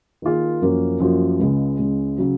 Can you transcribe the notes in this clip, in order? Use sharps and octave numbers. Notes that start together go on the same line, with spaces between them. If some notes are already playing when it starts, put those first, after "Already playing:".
D#3 A#3 F4 G#4
F#2 F3 A#3 C#4 F#4
F#2 F3 A#3 C#4 F#4
C#2 C#3 G#3
C#2 C#3 G#3
C#3 F#3